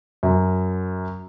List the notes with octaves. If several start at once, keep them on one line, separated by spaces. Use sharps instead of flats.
F#2